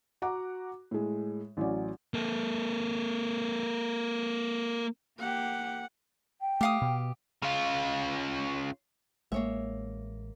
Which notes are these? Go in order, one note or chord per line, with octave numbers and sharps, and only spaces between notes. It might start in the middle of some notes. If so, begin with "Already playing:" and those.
F#4 F#5 A#5 D6
A2 G#3
A1 F#3 C#4 D5
A#3 A4
A#3 G4 F#5
G5
A3 G4 F5 D#6
B2
C#3 F4
A1 G#3 A#3 C#5 E5